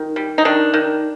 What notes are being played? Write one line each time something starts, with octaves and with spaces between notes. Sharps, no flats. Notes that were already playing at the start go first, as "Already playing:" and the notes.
Already playing: D#3
G3
D#4
D#3 D4
D#3